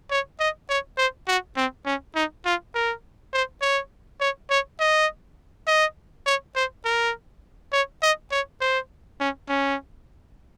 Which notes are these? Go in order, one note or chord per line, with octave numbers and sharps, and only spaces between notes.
C#5
D#5
C#5
C5
F#4
C4
C#4
D#4
F4
A#4
C5
C#5
C#5
C#5
D#5
D#5
C#5
C5
A#4
C#5
D#5
C#5
C5
C#4
C#4